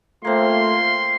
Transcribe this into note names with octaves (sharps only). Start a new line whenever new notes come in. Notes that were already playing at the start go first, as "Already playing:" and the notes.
A3 A#3 C4 F4 C6